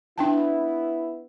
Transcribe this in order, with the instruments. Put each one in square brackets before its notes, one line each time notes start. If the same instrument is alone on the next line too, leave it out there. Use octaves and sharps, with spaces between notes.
[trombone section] B3 E4 [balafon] D4 G5 A5